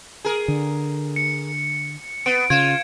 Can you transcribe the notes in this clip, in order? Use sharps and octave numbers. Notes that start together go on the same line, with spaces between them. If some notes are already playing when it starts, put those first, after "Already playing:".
G#4 A#4
D3
C#7
B3 D7
C#3 F4 G#6 E7